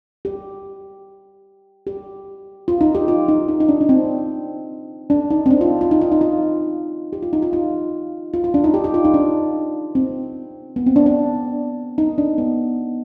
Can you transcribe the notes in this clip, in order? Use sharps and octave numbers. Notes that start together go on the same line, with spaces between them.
G4
G4
F4
D#4
G4
F4
D#4
D#4
D#4
D4
D4
C4
D4
D#4
C4
D4
F4
F4
D#4
F4
D#4
F4
G4
F4
D#4
F4
F4
F4
F4
D4
D#4
G4
G4
F4
D#4
D4
C4
B3
C4
D4
D4
D#4
D4
B3